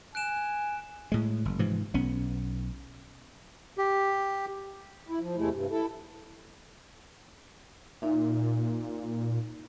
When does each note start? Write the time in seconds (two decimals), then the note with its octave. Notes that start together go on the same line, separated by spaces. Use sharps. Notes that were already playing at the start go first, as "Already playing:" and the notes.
0.15 G#5 F#6 D7 E7
1.12 A2 G#3
1.45 F#1
1.59 G#2 C3 E3 F3
1.94 B1 B3 C#4
3.78 G4
5.09 E4
5.20 F3
5.37 E2 C3 G#3 A3 E4
5.52 G2 C3
5.70 E4 A4
8.02 A#2 D#4 E5